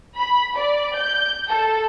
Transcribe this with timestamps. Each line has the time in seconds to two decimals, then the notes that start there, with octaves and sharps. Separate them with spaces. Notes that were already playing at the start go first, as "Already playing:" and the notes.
0.18 B5
0.57 D5
0.98 G6
1.50 A4